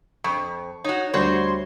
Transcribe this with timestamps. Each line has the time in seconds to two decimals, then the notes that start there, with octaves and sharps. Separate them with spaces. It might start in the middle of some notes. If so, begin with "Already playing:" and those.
0.24 F2 C#6
0.84 D#4 F#4 C#5
1.14 D2 G3 F#4 C5 C#5 C6